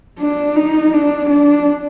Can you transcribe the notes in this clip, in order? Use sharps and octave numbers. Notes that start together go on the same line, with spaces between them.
D4
D#4
D4
D4